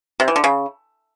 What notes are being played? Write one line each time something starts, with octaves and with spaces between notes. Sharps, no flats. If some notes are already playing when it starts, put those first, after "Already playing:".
C3
E3
D3
C#3